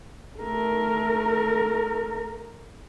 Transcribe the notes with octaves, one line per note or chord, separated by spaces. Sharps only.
A3 A#4